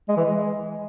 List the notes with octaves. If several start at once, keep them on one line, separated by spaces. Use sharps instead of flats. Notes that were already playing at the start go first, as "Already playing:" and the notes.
G#3
E3
G#3